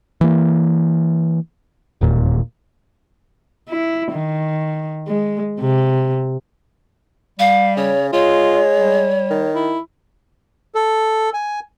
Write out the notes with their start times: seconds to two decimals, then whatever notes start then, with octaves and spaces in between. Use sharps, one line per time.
0.21 E3 A#3
2.01 E1 D#2 A#2
3.69 E4
4.12 D#3
5.08 G#3
5.61 C3
7.39 G3 F5
7.77 C#3 C#5
8.13 G#3 F4 C#5
8.78 G3
9.30 D#3
9.54 E4
10.75 A4
11.34 G#5